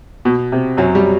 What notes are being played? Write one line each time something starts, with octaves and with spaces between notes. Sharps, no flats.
B2
C3
F#2 F#3
G3